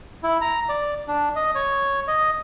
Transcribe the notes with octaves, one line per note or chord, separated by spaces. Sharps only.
E4
A#5
D5
D4
D#5
C#5
D#5